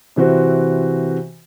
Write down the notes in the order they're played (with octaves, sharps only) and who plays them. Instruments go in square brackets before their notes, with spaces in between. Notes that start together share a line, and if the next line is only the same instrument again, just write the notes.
[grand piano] C3 E3 C4 F#4